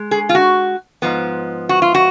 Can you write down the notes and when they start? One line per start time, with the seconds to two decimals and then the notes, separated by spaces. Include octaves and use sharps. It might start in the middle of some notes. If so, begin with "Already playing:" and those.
Already playing: G#3
0.11 G#4
0.29 F4
0.35 F#4
1.02 G#2 F3 B3
1.69 F#4
1.82 F4
1.95 F#4